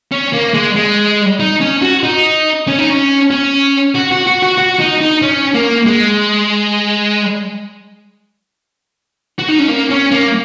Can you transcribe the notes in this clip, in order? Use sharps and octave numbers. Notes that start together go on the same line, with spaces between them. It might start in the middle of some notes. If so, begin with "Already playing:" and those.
C#4
A#3
G#3
G#3
D#4
C#4
F#4
D#4
C#4
D#4
C#4
C#4
F#4
F#4
F#4
F#4
F#4
D#4
D#4
C#4
A#3
G#3
F#4
D#4
C#4
A#3
C#4
A#3